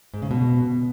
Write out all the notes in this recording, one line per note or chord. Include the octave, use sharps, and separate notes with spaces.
G#2
C#3
B2